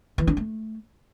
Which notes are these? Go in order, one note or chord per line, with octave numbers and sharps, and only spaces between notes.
E3
D4
A3